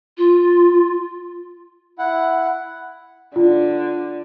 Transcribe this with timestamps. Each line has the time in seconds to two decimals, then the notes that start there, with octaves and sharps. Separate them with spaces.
0.18 F4
1.99 E4 F#5
3.36 D3 F4